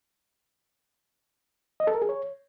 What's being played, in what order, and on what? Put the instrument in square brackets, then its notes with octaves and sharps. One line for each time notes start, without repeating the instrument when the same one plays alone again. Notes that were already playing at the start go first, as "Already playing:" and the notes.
[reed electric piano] D#5
A4
A#4
G#4
C#5